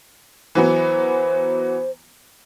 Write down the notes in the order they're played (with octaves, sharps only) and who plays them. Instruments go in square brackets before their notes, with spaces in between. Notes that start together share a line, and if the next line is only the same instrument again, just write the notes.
[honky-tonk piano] E3 F#3 B3 [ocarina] C5